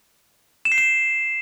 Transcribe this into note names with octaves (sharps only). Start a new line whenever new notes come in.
E7
C7
E7